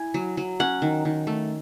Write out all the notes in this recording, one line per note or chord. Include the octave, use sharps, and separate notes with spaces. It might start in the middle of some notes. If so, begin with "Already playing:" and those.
Already playing: E4 G#5
F#3
F#3
C#4 F#5
D#3
D#3
A3